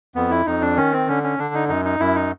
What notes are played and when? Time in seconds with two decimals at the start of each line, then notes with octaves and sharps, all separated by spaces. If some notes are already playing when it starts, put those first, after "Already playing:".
0.15 F2 B3
0.30 E4
0.46 F2 D#4
0.62 D4
0.77 D#3 C#4
0.92 C4
1.08 D3 C#4
1.23 C#4
1.39 D3 D4
1.54 D#4
1.69 F#2 D#4
1.85 D#4
2.00 F#2 E4
2.15 D#4